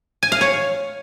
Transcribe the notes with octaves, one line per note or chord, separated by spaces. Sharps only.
G#5
F5
C#5